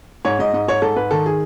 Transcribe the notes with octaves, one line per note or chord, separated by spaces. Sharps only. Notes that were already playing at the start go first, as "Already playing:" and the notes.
G#2 C#5
G#2 D#5
G#2 D#5
G#2 C#5
G#2 A4
G#2 B4
D#3 A4
G#4